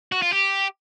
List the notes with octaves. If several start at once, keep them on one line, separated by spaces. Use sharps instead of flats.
F#4
F4
G4